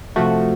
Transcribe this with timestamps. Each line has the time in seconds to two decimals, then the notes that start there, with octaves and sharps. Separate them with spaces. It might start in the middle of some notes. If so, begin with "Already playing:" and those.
0.16 C3 F3 A3 F#4